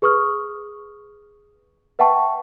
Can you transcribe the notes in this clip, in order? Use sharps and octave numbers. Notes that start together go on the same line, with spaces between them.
G#4 B4 C#6 D#6 F6
B4 E5 F#5 G5 A5 C#6